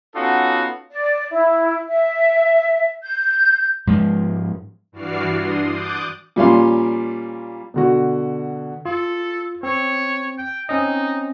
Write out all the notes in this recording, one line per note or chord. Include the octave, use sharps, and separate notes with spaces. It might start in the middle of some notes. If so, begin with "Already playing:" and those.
B3 C#4 D#4 F4 F#4 A4
D5
E4
E5
G6
G#2 F3 G#3
G2 E3 F#4 D5 F6 C7
D4 C6 D#6
D6 D#6 F#6 G6 A6
A#2 F3 G3 C#4 F5 C6
B2 D3 F#4
F4 A4
C4 C#5
G5
C4 C#4 D#4 D#5